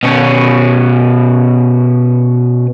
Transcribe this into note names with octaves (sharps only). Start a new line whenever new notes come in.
B2 C#4